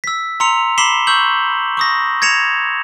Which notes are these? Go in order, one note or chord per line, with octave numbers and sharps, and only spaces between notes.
E6 B6
A#5 C6 E6 C#7 F7
B5 D6 B6 C7 E7 G7
C#6 E6 G6 F#7
C#6 D#6 A#6
G#6 A#6 C#7 E7 F7